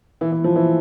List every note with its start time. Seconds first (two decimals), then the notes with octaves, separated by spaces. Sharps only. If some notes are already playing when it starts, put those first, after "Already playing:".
0.21 E3
0.32 E3
0.44 F3
0.56 E3